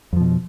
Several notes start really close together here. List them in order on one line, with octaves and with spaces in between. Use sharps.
F2 F3 B2